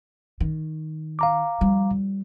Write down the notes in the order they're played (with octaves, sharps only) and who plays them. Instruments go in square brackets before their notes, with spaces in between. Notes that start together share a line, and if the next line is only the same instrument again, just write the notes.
[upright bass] D#3
[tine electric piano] F5 A#5 D6
[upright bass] F3 G3